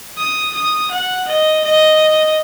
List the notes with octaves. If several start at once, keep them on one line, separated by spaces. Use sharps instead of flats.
D#6
D#6
F#5
D#5
D#5